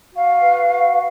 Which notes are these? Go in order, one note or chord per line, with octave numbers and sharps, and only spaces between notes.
F#4 F5
B4
F#4